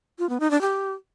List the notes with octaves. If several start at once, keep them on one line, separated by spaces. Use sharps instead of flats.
F4
B3
D#4
D4
G4